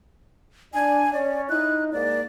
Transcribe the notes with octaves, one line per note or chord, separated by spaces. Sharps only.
D4 G#5
C#4 C#5 D5
D#4 E4 F#6
G#2 A#3 D5